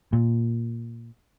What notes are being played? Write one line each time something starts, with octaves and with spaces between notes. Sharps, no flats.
A#2